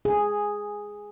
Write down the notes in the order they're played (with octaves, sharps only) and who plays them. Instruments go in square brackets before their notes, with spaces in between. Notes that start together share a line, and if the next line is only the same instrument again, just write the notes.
[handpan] G#4